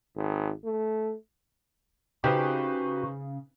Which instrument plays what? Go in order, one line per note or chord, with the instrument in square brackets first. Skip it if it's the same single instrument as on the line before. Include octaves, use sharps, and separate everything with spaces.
[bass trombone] G#1
A3
[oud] C#3 [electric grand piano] D#4 B4 C5 [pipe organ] F#4 [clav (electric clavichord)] G4